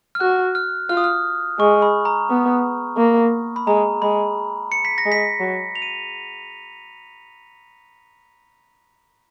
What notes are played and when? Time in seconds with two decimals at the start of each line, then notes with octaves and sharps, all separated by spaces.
0.15 F6
0.20 F#4 F#6
0.55 F6
0.89 F4 F6
0.97 D#6
1.04 F6
1.59 G#3 C#6
1.82 B5
2.05 A#5
2.29 B3
2.97 A#3
3.56 B5
3.67 G#3 A#5
4.02 G#3 B5
4.72 C#7
4.85 B6
4.98 A#6
5.05 G#3
5.12 B6
5.40 F#3
5.75 F7
5.82 D#7